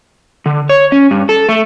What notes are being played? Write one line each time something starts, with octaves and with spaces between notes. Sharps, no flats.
D3
C#5
C#4
G2
A4
A3